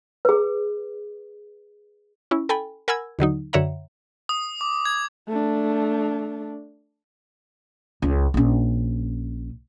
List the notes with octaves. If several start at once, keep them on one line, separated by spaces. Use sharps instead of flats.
G#4 B4
C#4 E4
A4 G5 G#5 B5
A#4 F#5 G#5 B5 E6 G#6
D#2 D3 F#3 D#4
F#2 D3 C#5 E5 F#5 A#5
D#6
D6
G#6
A3 D4
C#2
A#1 C#4